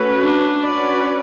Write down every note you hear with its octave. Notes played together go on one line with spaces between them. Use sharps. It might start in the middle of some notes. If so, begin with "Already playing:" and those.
Already playing: A3 C#4 F#4 B4
D4
C#4 F#4 B4 D5